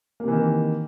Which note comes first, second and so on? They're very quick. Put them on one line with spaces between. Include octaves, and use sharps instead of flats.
A#3 C3 E3 D#3